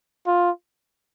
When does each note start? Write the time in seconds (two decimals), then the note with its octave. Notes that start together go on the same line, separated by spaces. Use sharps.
0.27 F4